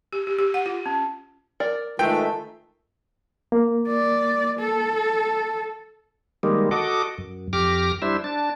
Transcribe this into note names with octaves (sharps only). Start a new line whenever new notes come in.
G4
G4
G4
F#5
F4
C#4
A#4 D5
D#3 G#3 A3 D#4 F4 B4 G5
A#3
D5
A4
D#3 G3 G#3 A#3
F#4 A4 D#5 D6
F#2
F2 G4 D6 F6 A#6
G3 D4 E4 C5 E5
D4 A5